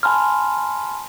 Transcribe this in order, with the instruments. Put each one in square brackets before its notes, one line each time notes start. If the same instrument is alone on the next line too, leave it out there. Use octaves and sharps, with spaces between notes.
[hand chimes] G#5 A5 B5 C6 F6